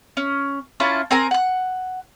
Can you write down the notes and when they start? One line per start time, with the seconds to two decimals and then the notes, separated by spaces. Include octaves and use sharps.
0.17 C#4
0.80 C#4 E4 F4 A5
1.11 C4 A#4 G#5 A#5
1.31 F#5 F#6